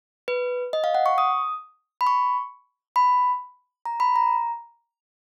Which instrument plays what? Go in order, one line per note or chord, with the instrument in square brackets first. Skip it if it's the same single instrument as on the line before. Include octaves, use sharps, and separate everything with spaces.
[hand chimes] B4
D#5
F5
F#5
C#6
D#6
B5
C#6
B5
A#5
B5
A#5